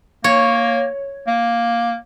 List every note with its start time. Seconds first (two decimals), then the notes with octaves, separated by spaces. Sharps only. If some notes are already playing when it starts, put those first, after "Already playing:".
0.24 A#3 C#5
1.27 A#3